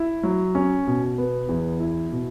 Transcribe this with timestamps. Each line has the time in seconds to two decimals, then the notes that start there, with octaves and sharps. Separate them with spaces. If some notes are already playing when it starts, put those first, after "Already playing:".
Already playing: E4
0.23 F#3
0.55 C#4
0.87 B2
1.18 B3
1.49 E2
1.80 E4
2.12 B2